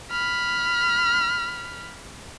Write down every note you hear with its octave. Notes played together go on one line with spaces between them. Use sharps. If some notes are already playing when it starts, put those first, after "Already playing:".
B5 F6